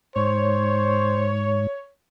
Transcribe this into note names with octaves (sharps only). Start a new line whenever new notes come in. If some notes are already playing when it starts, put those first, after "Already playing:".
G#2 C5 C#5